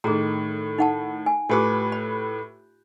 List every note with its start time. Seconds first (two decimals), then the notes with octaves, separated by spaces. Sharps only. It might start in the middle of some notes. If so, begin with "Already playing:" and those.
0.04 A2 D#3 G#4 A#5
0.78 D#4 F#5 A5
1.26 G#5
1.49 A2 F4 G4 B4 D6
1.92 B5